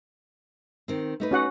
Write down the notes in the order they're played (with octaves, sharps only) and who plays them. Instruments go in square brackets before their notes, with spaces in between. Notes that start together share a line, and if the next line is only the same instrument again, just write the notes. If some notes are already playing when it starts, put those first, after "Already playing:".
[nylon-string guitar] D#3 C4
A3 D#4 B4
[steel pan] C#4 F#4 F#5